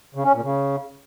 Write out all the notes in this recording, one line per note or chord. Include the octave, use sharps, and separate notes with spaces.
C#3
C#4
A#2
C#3